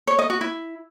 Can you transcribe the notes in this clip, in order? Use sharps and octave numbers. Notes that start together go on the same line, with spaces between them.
C#5
D#5
F#4
E4